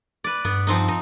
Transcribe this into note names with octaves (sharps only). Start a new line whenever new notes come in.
B4 D5
G2 B3
F3 C4 D#4
D#4